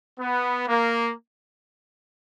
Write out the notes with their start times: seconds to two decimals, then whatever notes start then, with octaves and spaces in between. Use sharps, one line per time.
0.19 B3
0.67 A#3